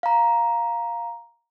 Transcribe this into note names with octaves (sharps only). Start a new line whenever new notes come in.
F5 A#5